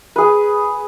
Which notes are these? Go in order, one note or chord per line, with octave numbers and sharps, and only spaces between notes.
G#4 B4